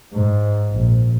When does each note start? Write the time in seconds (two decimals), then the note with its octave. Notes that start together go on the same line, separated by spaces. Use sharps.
0.13 G#2
0.71 A#1